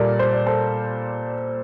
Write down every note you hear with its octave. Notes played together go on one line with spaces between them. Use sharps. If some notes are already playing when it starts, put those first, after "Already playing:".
Already playing: A#2 G3 A4 A#4 D5
C5
D5
A4 C5